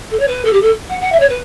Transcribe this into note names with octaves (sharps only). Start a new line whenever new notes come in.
A4
C#5
B4
A4
G4
A4
F#5
F#5
E5
C#5
B4